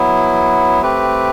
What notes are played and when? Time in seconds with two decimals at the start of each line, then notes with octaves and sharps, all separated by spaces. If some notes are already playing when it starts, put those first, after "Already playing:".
Already playing: F#3 B3 E4
0.82 A3 C4 G4 B4